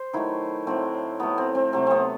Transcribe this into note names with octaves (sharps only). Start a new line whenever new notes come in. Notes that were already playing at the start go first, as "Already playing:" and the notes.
Already playing: C5
D#3 F#3 A3 E4
A2 F#3 A3 C4
A2 F#3 A3 B3
C4
C4
C3 F#3 A3 C4
B3 C4